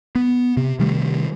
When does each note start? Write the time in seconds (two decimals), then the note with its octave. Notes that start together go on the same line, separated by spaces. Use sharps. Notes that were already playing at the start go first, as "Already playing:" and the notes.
0.15 B3
0.57 C3
0.79 C3 D#3 G3 A3